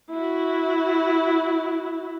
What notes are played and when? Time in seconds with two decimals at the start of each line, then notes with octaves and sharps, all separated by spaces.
0.11 E4 F#4